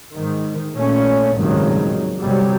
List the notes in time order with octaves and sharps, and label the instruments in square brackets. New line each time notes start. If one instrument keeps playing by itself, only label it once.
[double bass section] G#2 D#3
A#2 A3 C#4
G#1 C#2 G2 A#2 D#3 F#3
G1 C3 F#3 G3